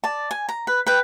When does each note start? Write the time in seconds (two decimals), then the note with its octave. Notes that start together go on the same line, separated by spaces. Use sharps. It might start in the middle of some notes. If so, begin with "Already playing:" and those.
0.04 D5 A5
0.31 G#5
0.49 A#5
0.67 B4
0.87 B4 G5